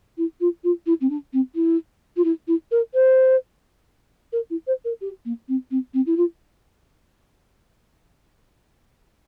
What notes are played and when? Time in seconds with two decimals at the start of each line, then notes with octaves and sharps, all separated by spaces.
0.18 E4
0.40 F4
0.64 F4
0.86 E4
1.01 C4
1.09 D4
1.33 C4
1.55 E4
2.17 F4
2.24 E4
2.48 E4
2.71 A#4
2.94 C5
4.33 A#4
4.50 E4
4.67 C5
4.85 A#4
5.01 G4
5.25 A#3
5.48 C4
5.71 C4
5.94 C4
6.06 E4
6.17 F4